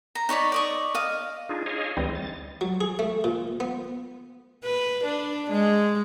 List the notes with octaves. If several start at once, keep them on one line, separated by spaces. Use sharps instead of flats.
A#5
D#4 C#5 D5 B5
D5 D#5 C#6
D#5 F5
D4 D#4 F4 G#4
G#4 C#5 D#5 F5
D2 E3 G3 C4 D#5
A6
F#3
G#4
A3
A#2
B3
B4
D4
G#3